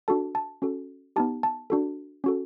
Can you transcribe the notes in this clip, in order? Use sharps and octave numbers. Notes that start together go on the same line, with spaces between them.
D4 F#4 A4 A5
A5
C#4 F#4 A4
B3 D#4 G4 A5
A5
D4 F#4 A4
C#4 F#4 A4